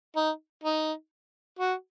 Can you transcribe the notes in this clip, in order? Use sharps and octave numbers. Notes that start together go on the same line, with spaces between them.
D#4
D#4
F#4